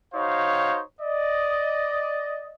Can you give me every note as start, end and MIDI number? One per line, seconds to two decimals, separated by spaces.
0.14 0.80 63
0.14 0.80 66
0.14 0.80 72
0.14 0.80 73
0.14 0.80 77
1.01 2.53 74
1.01 2.53 75